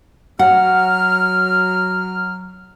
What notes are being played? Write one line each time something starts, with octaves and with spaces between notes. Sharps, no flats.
F#3 F#5 F6